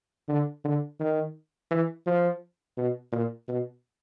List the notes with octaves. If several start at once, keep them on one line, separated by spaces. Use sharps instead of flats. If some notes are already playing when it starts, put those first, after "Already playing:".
D3
D3
D#3
E3
F3
B2
A#2
B2